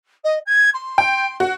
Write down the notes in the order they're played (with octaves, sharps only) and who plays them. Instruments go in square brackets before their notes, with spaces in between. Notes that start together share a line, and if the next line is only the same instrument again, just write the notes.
[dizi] D#5
G#6
C6
[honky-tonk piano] G5
F#4